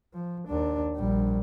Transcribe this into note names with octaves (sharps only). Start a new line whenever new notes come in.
F3
D#2 D4
A#1 G3